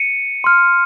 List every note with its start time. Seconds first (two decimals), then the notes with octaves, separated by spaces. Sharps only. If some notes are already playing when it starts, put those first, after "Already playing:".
Already playing: C#7 D#7
0.44 C6 F6